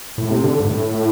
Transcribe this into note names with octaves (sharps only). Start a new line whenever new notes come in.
A2
C3
D3
G2
A2